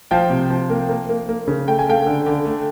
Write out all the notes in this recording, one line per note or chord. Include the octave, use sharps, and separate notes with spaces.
F3 F5 G5
C3
F3
A#3
A#3
A#3
A#3
C#3
A3 G5
G#5
A3 F5 G5
D3
D3
A3